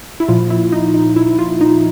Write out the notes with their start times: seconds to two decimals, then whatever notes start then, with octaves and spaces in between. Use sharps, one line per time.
0.20 E4
0.28 A#2 F3 F4
0.50 E4
0.72 D#4
0.94 D#4
1.16 E4
1.39 F4
1.61 D#4